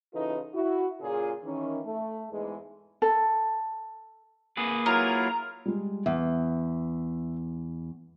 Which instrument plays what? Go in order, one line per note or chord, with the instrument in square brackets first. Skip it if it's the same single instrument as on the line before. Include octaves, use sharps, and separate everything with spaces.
[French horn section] C#3 E3 D#4 F4 A4 B4
E4 F#4
A#2 C#3 F4 G#4
D#3 E3 C#4
A3
E2 G#2 E3 G#3
[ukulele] A4
[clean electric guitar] A#3 G#4 B4
[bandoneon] F#3 E4 F4 [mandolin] A#4 [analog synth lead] A#5
[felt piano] G3 G#3
[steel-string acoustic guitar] E2 [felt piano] E5